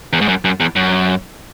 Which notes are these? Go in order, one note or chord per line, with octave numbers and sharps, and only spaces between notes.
E2
G#2
F#2
F#2
E2
F#2